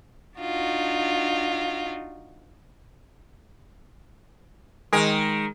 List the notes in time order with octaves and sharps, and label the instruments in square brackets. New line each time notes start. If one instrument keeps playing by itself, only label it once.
[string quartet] D4 D#4 F4 F#4
[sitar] D#3 A#4 [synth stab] G#3